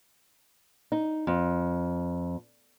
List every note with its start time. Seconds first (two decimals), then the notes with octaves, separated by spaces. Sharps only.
0.92 D#4
1.27 F2